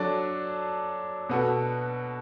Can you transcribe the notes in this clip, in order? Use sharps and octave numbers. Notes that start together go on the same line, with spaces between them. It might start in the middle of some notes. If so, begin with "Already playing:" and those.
Already playing: F#3 D4 A4 D5
B2 B3 F#4 A4